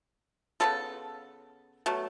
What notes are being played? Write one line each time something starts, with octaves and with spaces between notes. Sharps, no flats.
C#3 G#3 B3 A4
B2 F#3 A3